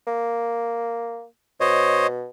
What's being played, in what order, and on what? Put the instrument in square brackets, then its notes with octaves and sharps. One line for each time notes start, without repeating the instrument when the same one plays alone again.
[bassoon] A#3
[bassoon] B2 [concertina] C5 C#5 D#5